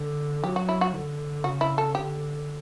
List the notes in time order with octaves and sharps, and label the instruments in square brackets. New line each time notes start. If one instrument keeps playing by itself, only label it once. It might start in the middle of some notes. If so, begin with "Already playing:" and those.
Already playing: [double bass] D3
[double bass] F#3 [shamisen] G4
[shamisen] F#4
E4
F#4
[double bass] D3
[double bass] C#3 [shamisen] F#4
[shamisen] E4
A4
[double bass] D3 [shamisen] G4